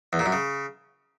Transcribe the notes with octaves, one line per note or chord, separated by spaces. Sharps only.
E2
A#2
F#2
C#3